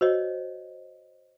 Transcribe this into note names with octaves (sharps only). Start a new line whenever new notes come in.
F#4 C5 C#5 D#5